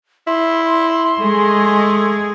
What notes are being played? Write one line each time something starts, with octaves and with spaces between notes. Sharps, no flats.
E4 C6
G#3 A3 G#4